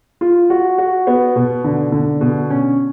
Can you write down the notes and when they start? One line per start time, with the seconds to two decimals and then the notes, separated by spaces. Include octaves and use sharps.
0.21 F4
0.50 F#4
0.78 F#4
1.07 B3
1.36 B2
1.64 D3
1.92 D3
2.21 B2
2.50 C#4